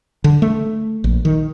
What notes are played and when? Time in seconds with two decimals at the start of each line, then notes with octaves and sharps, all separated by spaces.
0.24 D3
0.42 A3
1.04 A#1
1.25 D#3